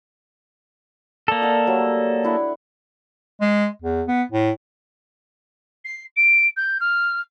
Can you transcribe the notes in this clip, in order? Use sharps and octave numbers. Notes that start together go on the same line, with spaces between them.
A#3 A4 D5
D#5 F#5 E6
F#3 G3 A3
D4 E4 F#5
G#3
E2
B3
A2
C7
D7
G6
F6